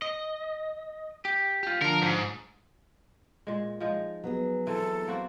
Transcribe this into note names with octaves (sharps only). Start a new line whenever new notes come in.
D#5
G4
F4 G4
D3 F3 A#4
G#2
A#2 G#3
F3 G#3 D#4
F#3 B3 G#4
E3 C4 A4
A#3 C4 F#4